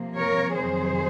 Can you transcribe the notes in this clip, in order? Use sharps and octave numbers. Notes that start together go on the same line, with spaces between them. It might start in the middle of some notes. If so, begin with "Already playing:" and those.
Already playing: C3 F3 A#3
A#4 C#5
F2 C3 D#3 F#3 G#4 C5